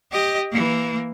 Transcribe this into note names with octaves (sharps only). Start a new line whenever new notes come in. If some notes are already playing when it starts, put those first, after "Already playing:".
G4 D#5
E3 A#3